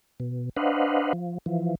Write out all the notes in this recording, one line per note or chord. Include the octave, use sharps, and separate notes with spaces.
B2
D4 B4 C5 D#5 F5 F#5
F3
E3 F3